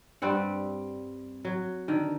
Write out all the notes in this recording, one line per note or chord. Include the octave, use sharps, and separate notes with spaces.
G2 G3 C4 F#5
F#3
D3 D#3